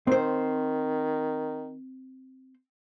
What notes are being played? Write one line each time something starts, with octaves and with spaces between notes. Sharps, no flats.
D#3 C4 C5